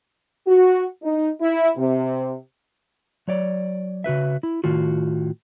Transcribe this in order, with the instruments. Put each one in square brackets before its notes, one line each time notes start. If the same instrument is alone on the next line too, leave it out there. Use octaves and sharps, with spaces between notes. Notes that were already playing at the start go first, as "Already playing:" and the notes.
[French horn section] F#4
D#4
E4
C3
[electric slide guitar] F#3 C#5 D5
C#3 F#4 B4 E5
E4
A2 D#3 F4 F#4